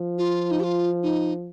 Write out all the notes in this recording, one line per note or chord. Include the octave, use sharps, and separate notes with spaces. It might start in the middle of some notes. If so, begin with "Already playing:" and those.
Already playing: F3
F4
D#4
G4
F4
D#4